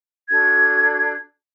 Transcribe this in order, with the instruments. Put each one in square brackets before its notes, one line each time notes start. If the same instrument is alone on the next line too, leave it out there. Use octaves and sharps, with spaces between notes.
[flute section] D4 F#4 A4 G#6